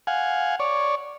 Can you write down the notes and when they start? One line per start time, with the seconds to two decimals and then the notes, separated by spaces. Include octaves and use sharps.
0.07 F5 F#5 G#5
0.60 C#5 D5